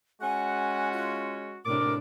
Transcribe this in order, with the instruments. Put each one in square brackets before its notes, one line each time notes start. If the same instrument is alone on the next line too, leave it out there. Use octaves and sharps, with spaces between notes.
[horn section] G#3 C#4 F#4 [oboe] F#5 [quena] G#5
[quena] F4
[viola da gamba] A2 C3 D4 [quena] A#4 [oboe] D6